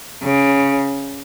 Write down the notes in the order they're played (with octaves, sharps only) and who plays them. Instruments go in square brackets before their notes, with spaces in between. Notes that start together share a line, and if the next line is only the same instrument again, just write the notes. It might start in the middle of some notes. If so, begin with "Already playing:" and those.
[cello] C#3